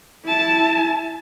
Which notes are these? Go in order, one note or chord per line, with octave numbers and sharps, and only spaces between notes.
E4 A5